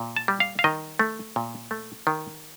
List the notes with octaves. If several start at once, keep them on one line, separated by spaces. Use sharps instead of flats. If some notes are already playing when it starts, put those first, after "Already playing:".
Already playing: A#2
A5
G3
F5
F5
D#3 D#5
A3
A#2
A3
D#3